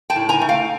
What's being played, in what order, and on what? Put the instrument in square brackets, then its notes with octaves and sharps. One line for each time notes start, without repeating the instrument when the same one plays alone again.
[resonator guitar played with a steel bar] G5 A5
A2
G#5 A#5
A3
F5 G5